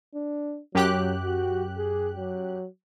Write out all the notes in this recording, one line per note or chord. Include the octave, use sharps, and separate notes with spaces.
D4
F#2 F#3 G4 F#6
F#4
G#4
F#3